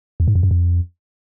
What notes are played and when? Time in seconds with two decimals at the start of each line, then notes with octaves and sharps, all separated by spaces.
0.20 E2
0.28 G#2
0.35 F2
0.43 F#2
0.51 F2